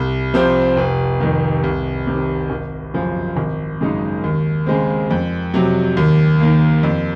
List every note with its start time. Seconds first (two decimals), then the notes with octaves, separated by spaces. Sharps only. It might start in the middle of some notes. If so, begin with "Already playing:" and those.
Already playing: C2
0.34 C3 F3 C4
0.77 F1
1.20 F2 D#3
1.63 C2
2.07 C3 D#3
2.50 G#1
2.94 F#2 C#3 F3
3.37 G#1
3.80 F#2 C#3 G#3 D#4
4.24 D#2
4.66 C#3 G#3 C4
5.10 F2
5.54 C3 F#3
5.97 D#2
6.40 D#3 A#3
6.83 F2